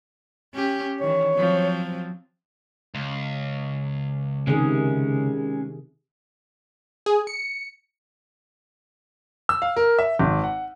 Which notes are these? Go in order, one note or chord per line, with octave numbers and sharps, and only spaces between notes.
C#4 G4
D#3 E3 C#5
F3 F#3 C4
C#2
C3 D#3 G#3 C#4 G#4
G#4
C#7
E6
F5
A#4
E5
G#1
F#5